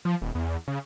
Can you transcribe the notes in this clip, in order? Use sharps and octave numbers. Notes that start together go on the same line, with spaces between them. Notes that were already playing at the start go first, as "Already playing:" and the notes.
F3
D#1
E2
C#3